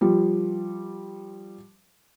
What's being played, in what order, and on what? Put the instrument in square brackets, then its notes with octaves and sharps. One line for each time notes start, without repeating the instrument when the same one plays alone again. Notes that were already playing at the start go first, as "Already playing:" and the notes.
[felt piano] F3 G3